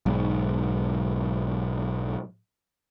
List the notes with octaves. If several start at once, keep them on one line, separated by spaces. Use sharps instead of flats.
B1 G#2